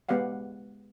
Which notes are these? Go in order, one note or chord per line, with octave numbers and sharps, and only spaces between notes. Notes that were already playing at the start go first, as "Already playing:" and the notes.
G#3 B3 G4 D5 F5 F#5